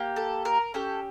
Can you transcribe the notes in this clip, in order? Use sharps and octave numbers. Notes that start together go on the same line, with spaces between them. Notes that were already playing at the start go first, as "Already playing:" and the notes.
Already playing: A#3 G4
A4
A#4
C#4 G4 A4